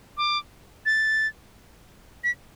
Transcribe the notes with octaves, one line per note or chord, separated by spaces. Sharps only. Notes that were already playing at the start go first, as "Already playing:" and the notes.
D6
A6
B6